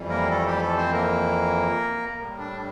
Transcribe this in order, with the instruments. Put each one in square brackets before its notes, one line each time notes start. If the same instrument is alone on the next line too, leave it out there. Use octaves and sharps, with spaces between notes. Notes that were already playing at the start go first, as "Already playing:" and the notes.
Already playing: [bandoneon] F2 E3 G3
A#3 A#4
A3 A4
G3 G4
A3 A4
C4 C5
A#3 A#4
A2 G3
D4